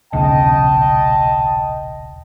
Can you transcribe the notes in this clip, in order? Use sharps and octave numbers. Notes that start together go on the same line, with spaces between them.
D#1 B1 C#3 D#5 G5 A5